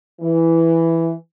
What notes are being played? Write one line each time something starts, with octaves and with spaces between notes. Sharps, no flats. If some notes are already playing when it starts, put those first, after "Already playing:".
E3